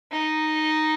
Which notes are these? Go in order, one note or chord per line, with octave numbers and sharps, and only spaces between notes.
D#4